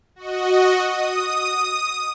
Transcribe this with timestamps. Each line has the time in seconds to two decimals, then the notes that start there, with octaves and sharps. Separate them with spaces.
0.16 F#4 D#5
0.82 D#6